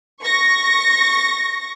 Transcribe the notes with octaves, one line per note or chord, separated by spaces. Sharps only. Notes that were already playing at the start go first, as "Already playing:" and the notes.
C#6 A#6